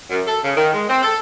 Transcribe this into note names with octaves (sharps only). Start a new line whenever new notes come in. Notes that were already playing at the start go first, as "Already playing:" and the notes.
F#2
A4
C#3
D#3
G#3
C4
A4